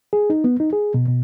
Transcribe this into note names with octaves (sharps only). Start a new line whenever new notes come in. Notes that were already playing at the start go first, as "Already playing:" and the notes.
G#4
D#4
B3
D#4
G#4
B2
B2